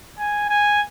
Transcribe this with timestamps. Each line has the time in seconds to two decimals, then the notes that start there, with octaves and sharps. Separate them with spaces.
0.19 G#5
0.49 G#5